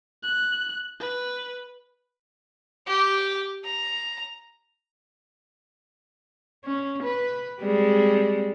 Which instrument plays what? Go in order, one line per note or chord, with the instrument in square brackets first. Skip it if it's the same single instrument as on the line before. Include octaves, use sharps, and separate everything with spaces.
[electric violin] F#6
B4
[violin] G4
A#5
[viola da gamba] C#4
B4
G3 G#3 C4